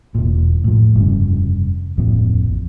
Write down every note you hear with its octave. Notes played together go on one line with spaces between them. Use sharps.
E1 A#2
A2 F3
F1 G2 C#3
D1 A1 F2 A#2